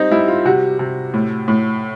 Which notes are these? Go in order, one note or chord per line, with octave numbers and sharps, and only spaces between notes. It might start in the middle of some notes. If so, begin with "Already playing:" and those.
Already playing: G3 C4 D#4
G3 E4
F4
C3 F#4
C3
A2
A2